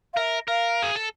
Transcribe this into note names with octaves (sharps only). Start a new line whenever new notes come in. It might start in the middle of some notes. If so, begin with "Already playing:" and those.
F5
A#4 E5
A#4 F5
G#4
A4